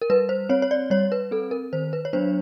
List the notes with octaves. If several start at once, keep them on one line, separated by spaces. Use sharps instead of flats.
A#4
G3 B4
C5
C4 C#5
C#5
D5
G3 C#5
B4
C4 A4
A#4
D#3 C5
B4
C#5
F#3 B3 D4 C5